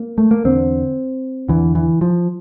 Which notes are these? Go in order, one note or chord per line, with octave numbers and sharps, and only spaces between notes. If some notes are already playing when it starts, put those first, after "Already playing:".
Already playing: A#3
A3
A#3
E2 D3 C4
E2 D3 E3
E3
F3